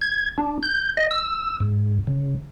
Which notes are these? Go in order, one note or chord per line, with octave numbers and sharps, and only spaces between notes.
G#6
D4
G6
D#5
E6
G#2
C#3